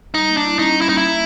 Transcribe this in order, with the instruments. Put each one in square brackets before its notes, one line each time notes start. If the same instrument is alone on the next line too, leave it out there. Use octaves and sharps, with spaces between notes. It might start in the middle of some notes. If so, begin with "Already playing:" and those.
[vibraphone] G3 [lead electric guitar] D#4
[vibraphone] A#3
[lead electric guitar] D4
[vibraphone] E4
[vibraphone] C#4 [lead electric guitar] D#4
[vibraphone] G3
[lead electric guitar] E4
[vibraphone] A#3 [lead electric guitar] D#4
[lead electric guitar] E4
[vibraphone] A#3